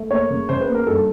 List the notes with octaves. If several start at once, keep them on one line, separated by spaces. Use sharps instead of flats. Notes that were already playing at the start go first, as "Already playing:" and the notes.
Already playing: A3
A#3 C#5
C#3
C#3 C5
B4
A#3
A#4
G2 A4